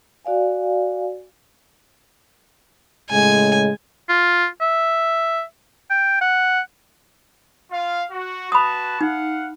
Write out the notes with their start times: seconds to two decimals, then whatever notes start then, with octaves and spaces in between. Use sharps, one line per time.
0.25 F#4 D5 F5 G#5
3.10 A2 C#3 G#3 G#5
4.09 F4
4.61 E5
5.90 G5
6.21 F#5
7.71 F4 F5
8.11 F#4
8.52 F#4 B4 A5 B5 D#6
9.01 D#4 F5 F#5